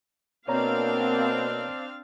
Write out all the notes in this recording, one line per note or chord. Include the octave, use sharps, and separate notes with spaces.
B2 A#3 C4 D4 C#5 D5 F5 A#5